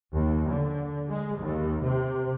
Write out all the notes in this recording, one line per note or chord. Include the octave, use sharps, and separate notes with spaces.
D#2
D3
G#3
D#2
C3